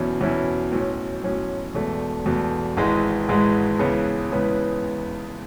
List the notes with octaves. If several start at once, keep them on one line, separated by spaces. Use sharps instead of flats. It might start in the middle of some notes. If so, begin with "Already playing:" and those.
Already playing: E2 B2 F#3 C#4 E4
E2 B2 F#3 C#4 E4
B1 A2 F#3 C#4
B1 A2 F#3 C#4
E1 E2 B2 A3
E1 E2 B2 A3
G#1 G#2 E3 G#3
G#1 G#2 E3 G#3
C#2 C#3 E3 B3
C#2 C#3 E3 B3